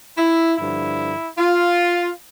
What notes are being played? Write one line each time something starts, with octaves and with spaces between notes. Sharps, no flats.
E4
G2 D3 F3 E4
F4